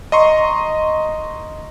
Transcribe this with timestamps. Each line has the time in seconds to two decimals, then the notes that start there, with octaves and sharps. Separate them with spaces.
0.12 D#5 A#5 C6 C#6